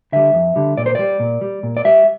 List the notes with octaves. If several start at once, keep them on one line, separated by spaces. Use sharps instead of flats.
D3 G3 E5
F2
D3 G3
A#2 D5
C5
G3 D5
A#2
G3
A#2
D5
G3 E5